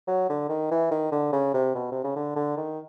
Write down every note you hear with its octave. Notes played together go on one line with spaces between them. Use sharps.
F#3
D3
D#3
E3
D#3
D3
C#3
C3
B2
C3
C#3
D3
D3
D#3